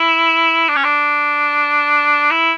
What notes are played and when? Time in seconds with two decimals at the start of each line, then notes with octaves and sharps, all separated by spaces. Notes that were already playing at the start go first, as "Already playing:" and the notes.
Already playing: E4
0.69 D4
0.76 C#4
0.84 D4
2.31 E4